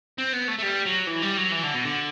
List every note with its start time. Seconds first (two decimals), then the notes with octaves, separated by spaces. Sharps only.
0.18 C4
0.33 B3
0.48 A3
0.58 A3
0.62 G3
0.85 F#3
1.07 E3
1.22 G3
1.37 F#3
1.51 E3
1.63 D3
1.74 B2
1.85 D3